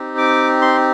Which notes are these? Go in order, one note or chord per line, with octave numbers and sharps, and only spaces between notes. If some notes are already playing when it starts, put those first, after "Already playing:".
Already playing: C4 D#4 G4
D6
C6